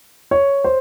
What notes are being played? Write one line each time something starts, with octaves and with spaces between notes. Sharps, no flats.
C#5
C5